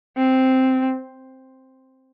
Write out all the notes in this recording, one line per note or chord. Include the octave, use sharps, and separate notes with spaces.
C4